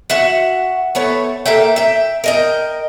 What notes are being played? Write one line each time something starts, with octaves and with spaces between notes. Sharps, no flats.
F#4 E5 F#5
A3 B3 C#5
A#3 A4 E5 G5
E5 G5
A#4 D#5 G5